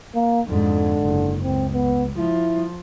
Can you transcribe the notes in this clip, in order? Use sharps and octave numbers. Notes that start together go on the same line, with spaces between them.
A#3
F2 G#2 D3
F#1
C#2 C4
B3
F3 E4